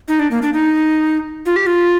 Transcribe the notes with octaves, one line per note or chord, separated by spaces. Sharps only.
D#4
D4
A#3
D4
D#4
F4
G4
F4